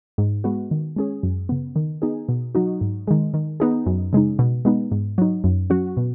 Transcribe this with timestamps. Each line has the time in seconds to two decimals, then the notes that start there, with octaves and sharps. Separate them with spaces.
0.18 G#2
0.44 G#3 B3 F#4
0.71 D#3
0.96 G#3 C#4 G#4
1.23 F#2
1.49 C#3 B3
1.76 D#3
2.02 B3 D#4 G#4
2.29 B2
2.55 F#3 D#4 F#4
2.81 G#2
3.07 D#3 G#3
3.34 D#3
3.60 B3 D#4 G#4
3.86 F#2
4.13 C#3 G#3 D#4
4.39 B2
4.65 G#3 B3 D#4
4.91 G#2
5.18 F#3 D#4
5.44 F#2
5.70 F#3 C#4 F#4
5.97 B2